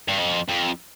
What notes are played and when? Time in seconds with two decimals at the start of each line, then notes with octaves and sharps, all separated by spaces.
0.08 G2
0.18 F2
0.49 F2